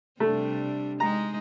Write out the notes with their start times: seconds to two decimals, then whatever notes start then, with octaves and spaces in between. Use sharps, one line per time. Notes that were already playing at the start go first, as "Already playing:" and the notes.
0.20 C3 G3 A3 D4
1.00 G#3 D#4 A#5